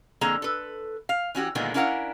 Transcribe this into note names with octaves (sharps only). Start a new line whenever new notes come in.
F2 D3 A#3 G#4 A#5
A4 B4
F5
E3 C#4 F#4 G4
A#2 D3 D#3 G#3 A#3 B3
C#4 D4 E4 A#4 F5 F#5